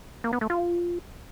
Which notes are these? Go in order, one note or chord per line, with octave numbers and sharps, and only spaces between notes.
A#3
B3
A3
F4